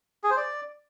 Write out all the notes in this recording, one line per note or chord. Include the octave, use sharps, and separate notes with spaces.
G#4
C5
D5